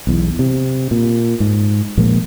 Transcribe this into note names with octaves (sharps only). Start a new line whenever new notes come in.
B1 E2
C3
A#2
G#2
A#2 F3 G#3 A#3